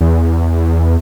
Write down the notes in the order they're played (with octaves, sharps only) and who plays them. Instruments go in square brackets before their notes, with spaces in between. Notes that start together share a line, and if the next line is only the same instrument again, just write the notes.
[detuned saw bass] E2